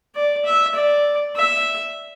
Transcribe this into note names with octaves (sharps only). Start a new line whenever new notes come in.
D5
E5
D5
E5